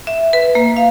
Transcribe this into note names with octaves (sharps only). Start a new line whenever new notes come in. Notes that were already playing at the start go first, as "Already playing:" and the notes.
E5
B4
A#3
F5